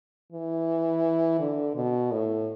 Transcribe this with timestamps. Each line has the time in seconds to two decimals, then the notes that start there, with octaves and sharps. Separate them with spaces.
0.33 E3
1.40 D3
1.75 B2
2.12 A2